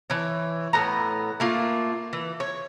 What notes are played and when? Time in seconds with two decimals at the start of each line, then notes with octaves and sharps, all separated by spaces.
0.10 E3 C#5
0.73 A2 B3 A#5
1.40 A3 A#3 F4
2.13 E3
2.40 C#5